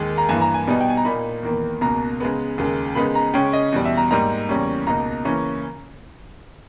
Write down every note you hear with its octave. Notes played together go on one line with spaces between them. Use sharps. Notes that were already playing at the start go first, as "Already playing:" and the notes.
Already playing: D#2 D#3 G#3
A#5
G2 E3 A#3 G#5
A#5
G#5
B2 G3 B3 D#4
G5
G#5
A#5
A#2 A#3 D#4 B5
E2 D#3 A#3
C#2 B2 A#3 A#5
C#3 G#3 B3
D#2 C#3 G#3
C#3 G#3 B3 D#4 B5
A#5
C#3 G#3 C#4 G5
D#5
E2 B2 G3
E5
A#5
G#2 G3 A#3 D#4 A#5
E2 C#3 G3 A#3 C#4
C#2 B2 A#3 D#4 A#5
C#3 E3 A#3 C#4